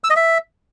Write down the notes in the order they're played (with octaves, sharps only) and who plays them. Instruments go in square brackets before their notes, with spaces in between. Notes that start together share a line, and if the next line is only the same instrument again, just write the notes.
[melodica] E6
D#5
E5